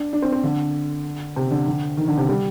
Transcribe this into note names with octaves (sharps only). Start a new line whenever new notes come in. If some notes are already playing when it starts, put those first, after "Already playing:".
Already playing: D4
D4
C4
C4
D3
C3
D3
D3
D#3
D3
C3
G3